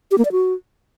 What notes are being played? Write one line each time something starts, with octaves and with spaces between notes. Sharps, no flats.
G4
A#3
D5
F#4